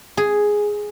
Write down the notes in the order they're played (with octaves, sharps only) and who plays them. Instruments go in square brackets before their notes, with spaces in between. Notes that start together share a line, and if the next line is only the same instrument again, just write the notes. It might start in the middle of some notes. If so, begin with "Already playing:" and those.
[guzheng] G#4